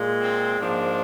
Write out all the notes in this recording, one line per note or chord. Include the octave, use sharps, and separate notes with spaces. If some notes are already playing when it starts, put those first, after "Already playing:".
Already playing: A#2 G#3
C4
G#2 F3 A#3 D4